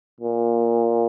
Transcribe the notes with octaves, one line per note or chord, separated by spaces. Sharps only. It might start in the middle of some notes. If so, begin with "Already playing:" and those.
A#2